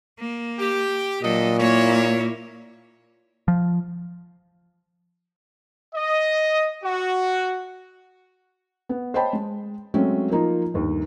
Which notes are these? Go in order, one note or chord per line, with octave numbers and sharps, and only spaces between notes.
A#3
G4
A#2 F#3 D4 A4 D#5
A#3 E4 C#5
F3
D#5
F#4
B3
C5 C#5 D#5 G5 A5 B5
G#3
F#3 G#3 A3 C4 C#4
F3 A#3 D#4 F4
G1 D#2